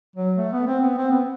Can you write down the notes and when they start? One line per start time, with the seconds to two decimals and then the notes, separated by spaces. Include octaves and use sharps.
0.16 F#3
0.38 A3
0.52 B3
0.67 C4
0.82 B3
0.97 C4
1.12 B3